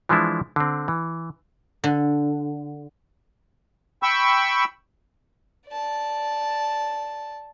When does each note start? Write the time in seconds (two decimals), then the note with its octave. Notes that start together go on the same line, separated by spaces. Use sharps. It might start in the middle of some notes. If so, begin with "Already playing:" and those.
0.09 E3 F3 G#3 D4 E4
0.56 D3 C4
0.88 E3
1.84 D3
4.03 G5 B5 C#6 E6
5.68 D5 A5